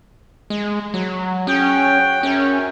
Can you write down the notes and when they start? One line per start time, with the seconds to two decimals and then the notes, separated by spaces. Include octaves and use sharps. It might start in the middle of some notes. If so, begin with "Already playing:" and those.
0.50 G#3
0.94 F#3
1.47 C#4 F#4 G#4 G5
2.23 F#2 C#4